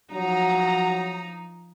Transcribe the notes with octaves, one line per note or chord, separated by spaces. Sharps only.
F3 F#3 D#4 A#5